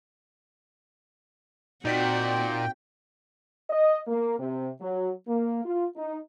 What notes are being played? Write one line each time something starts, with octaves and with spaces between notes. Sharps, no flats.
A#2 C4 D#4 F#4 D5 G5 B6
D#5
A#3
C3
F#3
A#3
F4
D#4